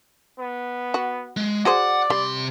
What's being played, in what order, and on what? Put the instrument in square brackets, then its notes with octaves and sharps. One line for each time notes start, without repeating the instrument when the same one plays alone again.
[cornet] B3
[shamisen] F#4
[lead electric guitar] G#3
[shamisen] F#4 G#4 C5 [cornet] D5 [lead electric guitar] F#5
[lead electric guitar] C3 C6 [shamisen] G3